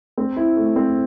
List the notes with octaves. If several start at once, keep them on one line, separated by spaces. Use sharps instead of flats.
C4
E4
A3
C4